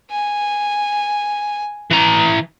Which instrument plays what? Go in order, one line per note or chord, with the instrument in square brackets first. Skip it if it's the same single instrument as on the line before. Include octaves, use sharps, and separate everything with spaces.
[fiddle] G#5
[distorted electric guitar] E3 A#5